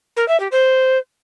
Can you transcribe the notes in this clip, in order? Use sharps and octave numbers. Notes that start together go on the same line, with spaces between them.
A#4
E5
G4
C5